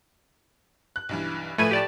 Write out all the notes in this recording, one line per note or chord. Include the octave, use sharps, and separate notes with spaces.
F#6
B1 G2 E3
A2 F3 A3 B4 G#5 D#7
G4 D5 A5